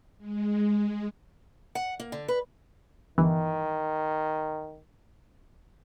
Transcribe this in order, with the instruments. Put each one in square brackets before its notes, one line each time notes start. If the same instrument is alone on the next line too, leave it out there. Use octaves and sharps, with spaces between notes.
[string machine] G#3
[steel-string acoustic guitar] F#5
A#3
D3
B4
[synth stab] G1 E3 [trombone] D#3